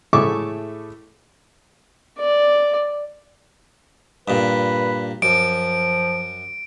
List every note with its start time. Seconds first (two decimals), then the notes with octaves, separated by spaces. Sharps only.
0.13 A2 A3 G#4 E5 C#6 D6
2.19 D5
4.28 G2 A#2 B4
5.22 F#2 F3 D7